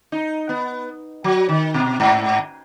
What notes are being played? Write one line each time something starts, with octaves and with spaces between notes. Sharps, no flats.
D#4
B3
F#3
D#3
B2
G#2